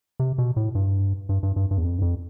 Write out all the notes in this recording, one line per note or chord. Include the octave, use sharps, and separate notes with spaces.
C3
B2
A2
G2
G2
G2
G2
G2
E2
F2
G2
F2